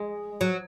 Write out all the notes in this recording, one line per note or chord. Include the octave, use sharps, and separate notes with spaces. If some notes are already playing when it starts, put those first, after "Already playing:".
Already playing: G#3
F#3